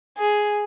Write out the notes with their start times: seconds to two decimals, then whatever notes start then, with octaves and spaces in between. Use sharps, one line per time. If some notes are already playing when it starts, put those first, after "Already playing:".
0.18 G#4